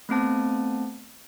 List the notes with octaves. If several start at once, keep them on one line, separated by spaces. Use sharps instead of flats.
A3 B3 C4 A5